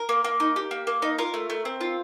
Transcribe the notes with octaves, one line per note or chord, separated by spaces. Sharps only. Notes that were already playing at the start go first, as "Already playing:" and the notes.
Already playing: A#4
A#3
A#3
D#4
G4
A#3
A#3
D#4
F4 A#4
A3
A3
C4
F4